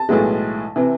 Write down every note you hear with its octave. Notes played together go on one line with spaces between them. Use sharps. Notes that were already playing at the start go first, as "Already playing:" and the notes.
Already playing: A5
B1 A2 E3 G#3
C3 E3